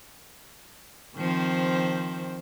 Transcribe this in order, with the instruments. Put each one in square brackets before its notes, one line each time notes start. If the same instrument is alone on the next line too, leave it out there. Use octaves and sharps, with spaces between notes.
[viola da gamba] D#3 F3 C4